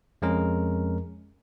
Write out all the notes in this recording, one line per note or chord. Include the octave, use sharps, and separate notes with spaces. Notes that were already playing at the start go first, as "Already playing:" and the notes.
F2 G#3 C#4 A#4